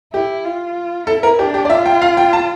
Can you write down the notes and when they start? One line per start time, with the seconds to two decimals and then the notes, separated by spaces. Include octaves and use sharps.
0.13 E4 G4
0.45 F4
1.07 E4 A4
1.23 A#4
1.39 D4 G4
1.54 G4
1.65 D5
1.70 F4 E5
1.86 G5
2.02 F5
2.17 G5
2.33 A5